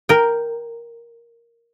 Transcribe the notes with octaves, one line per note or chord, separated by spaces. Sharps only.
A#4 G5